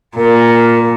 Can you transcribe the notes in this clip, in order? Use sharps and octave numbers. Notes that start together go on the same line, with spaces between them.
A#2 A#4